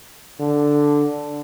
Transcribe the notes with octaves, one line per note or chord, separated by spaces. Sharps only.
D3